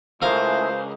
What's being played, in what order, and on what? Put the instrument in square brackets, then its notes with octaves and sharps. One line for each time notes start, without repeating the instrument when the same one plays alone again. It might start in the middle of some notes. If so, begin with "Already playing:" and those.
[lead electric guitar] C#2 [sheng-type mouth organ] A3 E4 G#4 [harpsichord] A#4 F5 [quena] C5